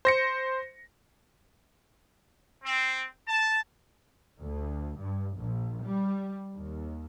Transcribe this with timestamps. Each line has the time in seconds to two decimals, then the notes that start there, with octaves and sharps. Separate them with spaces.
0.05 C5 A#6 C#7
2.64 C4
3.28 A5
4.40 D2
4.99 G2
5.36 A#1
5.85 G3
6.56 D#2